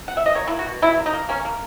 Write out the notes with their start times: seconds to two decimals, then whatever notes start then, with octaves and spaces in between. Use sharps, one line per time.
0.08 F#5
0.17 E5
0.26 D#5
0.35 A#3 C#5
0.47 E4
0.51 A#3
0.59 F#4
0.66 B2
0.82 B2 E4
0.98 A#3
1.06 D#4
1.13 A#3
1.29 A#3 C#4
1.45 A#3